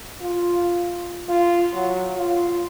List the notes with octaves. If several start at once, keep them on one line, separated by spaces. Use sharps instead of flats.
F4
F4
F#3
F4